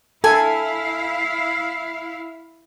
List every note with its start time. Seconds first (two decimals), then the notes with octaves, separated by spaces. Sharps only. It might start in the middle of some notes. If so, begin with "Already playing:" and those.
0.24 E4 A4 F5 G#5